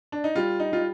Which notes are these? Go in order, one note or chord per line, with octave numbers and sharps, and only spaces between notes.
D4
D#4
G3 F4
D#4
G3 F4